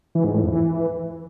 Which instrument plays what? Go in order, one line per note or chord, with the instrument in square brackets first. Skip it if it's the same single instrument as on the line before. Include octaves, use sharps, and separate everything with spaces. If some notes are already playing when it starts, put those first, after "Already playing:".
[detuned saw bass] E3
G#2
A2
F2
E3